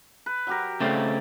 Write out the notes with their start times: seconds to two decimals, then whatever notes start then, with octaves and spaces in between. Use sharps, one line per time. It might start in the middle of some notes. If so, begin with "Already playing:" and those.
0.26 B4
0.47 F#3 G4 A#4
0.80 C#3 A3 C4 D5 F5